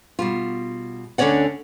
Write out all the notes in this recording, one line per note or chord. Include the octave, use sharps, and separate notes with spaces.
B2 G3 F4
D2 D3 C#4 C#5 D5 F#5